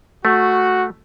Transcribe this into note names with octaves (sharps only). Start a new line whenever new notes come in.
A3 F#4